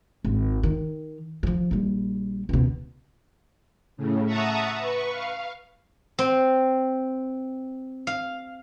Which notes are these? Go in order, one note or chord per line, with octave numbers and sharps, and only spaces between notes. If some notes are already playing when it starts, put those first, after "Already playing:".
G#1
D#3
E3 F3
A#1 G3
C#2 B2
A2 C#3
E5 F#5 A5 A#5 C#6 D#6
B4 C#6
F5
C4
F5